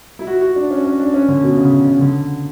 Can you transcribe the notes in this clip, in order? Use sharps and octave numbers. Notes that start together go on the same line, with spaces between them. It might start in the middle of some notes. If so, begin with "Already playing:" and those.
E4
F#4
F#4
D4
C#4
C#4
D4
C#4
D3
B2
C#3
C#3
C#3
D3